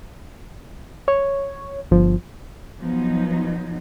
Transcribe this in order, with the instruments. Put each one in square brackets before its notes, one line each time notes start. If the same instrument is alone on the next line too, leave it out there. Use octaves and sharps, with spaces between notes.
[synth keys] C#5
G1 F3
[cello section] F3 F#3 B3 D#4